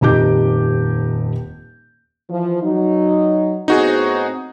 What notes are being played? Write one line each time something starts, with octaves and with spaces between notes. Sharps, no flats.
D#1 F2 D#4 G4 D6 G6
E3 F3
F#3 D#4
A2 B3 C4 D#4 F#4 G#4